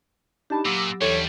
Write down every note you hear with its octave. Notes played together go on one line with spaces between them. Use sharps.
D4 D#4 G4 A5 B5
A#2 F#3 D6 E6 A#6
D#2 D3 E3 G3 A4 C#5 A6